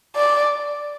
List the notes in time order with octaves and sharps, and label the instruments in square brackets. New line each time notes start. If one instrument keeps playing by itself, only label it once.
[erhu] D5